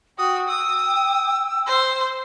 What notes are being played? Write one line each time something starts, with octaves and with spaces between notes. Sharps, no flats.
F#4 G5 D#6
D#6 E6
C5